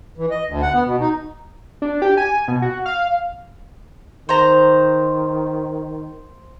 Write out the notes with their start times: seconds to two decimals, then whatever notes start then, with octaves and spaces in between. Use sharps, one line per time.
0.18 E3
0.31 D#5
0.47 D2
0.62 F#5
0.73 B3
0.85 B2
1.01 D#4
1.82 D4
2.02 G4
2.17 G#5
2.48 B2
2.62 F#4
2.86 F5
4.29 D#3 C5 A#5